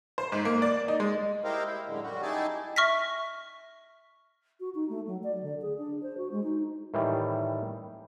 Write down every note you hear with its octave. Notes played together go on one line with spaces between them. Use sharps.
C5
G#2
A#3
D5
D#4
G#3
E4 G4 A#4 C5 D#5 F5
E4
F#2 A2 D3 G#3
F#2 G3 F#4
D#4 E4 G4 G#4 G#5 A5
E5 C#6 F6 A#6 B6
F#4
D#4
A3
F#3
D5
D3
G#4
D4
C5
F#4
G#3
D#4
A2 D#3 E3 G3